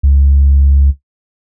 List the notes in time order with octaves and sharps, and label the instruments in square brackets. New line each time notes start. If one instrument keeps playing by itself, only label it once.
[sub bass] C#2